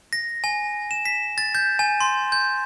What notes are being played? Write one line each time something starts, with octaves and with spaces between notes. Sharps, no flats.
A#6
G#5
E7
B6
A6
G6
G#5
C6
G6